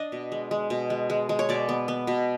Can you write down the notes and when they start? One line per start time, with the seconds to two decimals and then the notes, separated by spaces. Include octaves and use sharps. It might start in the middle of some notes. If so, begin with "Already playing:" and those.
Already playing: D4 D#5
0.12 B2
0.32 G#3
0.51 G#3
0.70 B2
0.90 G#3
1.10 G#3
1.29 G#3
1.39 C#5
1.49 B2 D5
1.69 B3
1.88 B3
2.07 B2